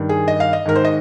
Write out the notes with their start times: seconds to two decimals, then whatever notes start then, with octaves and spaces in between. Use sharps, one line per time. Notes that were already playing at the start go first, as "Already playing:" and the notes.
Already playing: G2 D#3
0.09 G#4
0.28 D#5
0.40 F5
0.53 D#5
0.66 G#2 D#3 A#4
0.76 C5
0.85 D#5